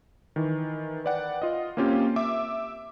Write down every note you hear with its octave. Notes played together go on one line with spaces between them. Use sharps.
D#3 E3
B4 D5 F#5 G5
F4 D#5
A#3 C4 C#4 F4 G4
E5 D6